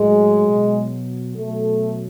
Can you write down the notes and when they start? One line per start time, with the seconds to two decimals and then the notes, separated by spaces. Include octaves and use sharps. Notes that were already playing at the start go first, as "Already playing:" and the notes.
Already playing: A2 F#3 G#3 G#4
0.48 B2 F#3
1.36 B2 F#3 A3 A4